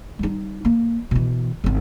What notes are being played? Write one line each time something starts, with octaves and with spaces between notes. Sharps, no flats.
G3 D#4
A#3
B2 E3
G#1 D#3